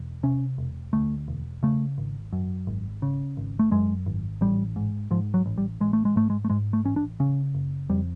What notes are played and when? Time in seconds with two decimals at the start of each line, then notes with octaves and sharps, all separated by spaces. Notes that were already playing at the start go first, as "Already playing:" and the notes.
Already playing: E1
0.23 C3 C#4
0.58 E1
0.93 D2 A3
1.28 E1
1.63 C#3 A3
1.98 G#1
2.33 F#2
2.67 G#1
3.02 C#3
3.37 G#1
3.59 A3
3.71 F#2 G#3
4.06 G#1
4.41 A1 G3
4.76 G#2
5.11 G#2 F3
5.34 F#3
5.46 A1
5.58 G3
5.81 A1 G#3
5.93 A3
6.05 G#3
6.16 G#2 A3
6.30 G#3
6.45 A3
6.50 G#2 G#3
6.73 A3
6.85 A1 C#4
6.96 D4
7.20 C#3 C#4
7.55 F#1
7.90 F2 G3